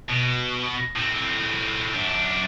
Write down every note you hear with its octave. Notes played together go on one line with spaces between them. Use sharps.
B2
A2 C4
F#2 D4